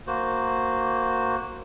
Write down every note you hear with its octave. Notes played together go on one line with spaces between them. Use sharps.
A#3 F#4 C5